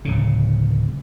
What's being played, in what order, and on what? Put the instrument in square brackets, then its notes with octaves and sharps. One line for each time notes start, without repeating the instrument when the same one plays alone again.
[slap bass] D1 C#3